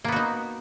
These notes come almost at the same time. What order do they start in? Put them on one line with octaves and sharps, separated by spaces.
A#3 B3 F#4 D#4